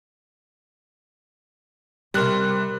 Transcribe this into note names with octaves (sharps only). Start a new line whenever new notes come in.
C3 G3 A#4 C6 F#6 E7